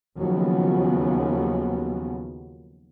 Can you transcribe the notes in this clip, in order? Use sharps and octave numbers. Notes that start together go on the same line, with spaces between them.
D#2 C#3 F3 F#3 B3